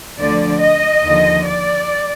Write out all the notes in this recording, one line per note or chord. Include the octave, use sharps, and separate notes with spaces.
D2 D3 F3 D5
D#5
D#2 D3 F3
D5